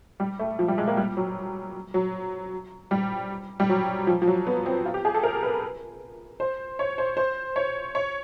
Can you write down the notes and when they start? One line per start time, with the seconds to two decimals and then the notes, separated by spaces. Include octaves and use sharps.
0.20 G3
0.39 A3
0.59 F3
0.68 G3
0.78 G#3
0.88 A#3
0.97 G3
1.17 F#3
1.94 F#3
2.91 G3
3.60 G3
3.69 F#3
4.07 F3
4.22 F3
4.27 F#3
4.47 B3
4.66 C4
4.86 F4
4.94 G4
5.05 G#4
5.14 A4
5.23 A#4
5.43 B4
6.40 C5
6.79 C#5
6.98 C5
7.17 C5
7.56 C#5
7.95 C#5